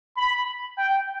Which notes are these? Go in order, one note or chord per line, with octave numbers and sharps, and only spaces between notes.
B5
G5